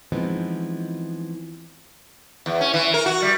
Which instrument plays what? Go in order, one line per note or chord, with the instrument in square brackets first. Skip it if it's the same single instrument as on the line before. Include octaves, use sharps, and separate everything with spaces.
[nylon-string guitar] E3 F3 G#3 B3 C4 D#4
[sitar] E2
C#4
E3
A#4
F#4
G3